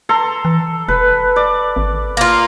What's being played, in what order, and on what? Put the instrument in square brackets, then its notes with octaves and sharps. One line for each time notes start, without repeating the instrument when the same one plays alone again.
[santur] A4 A#5 C6
[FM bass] E3
[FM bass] F1 [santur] B4
[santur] D5
[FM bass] G#1
[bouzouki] A#3 F4